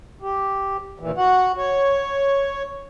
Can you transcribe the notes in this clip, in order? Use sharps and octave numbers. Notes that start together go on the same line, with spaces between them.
G4
D#2 A#2 E3
F#4 F#5
C#5